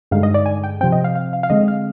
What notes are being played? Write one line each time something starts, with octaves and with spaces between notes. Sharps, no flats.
G2 D3 G#3 D#4 F5
D#5
D5
G#5
G5
C3 F3 C4 G5
D#5
F5
F5
F5
F5
D3 G#3 C4 D#5
F5